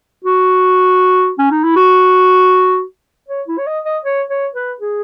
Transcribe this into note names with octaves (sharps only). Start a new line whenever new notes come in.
F#4
C#4
D#4
E4
F#4
C#5
E4
C#5
D#5
D#5
C#5
C#5
B4
G#4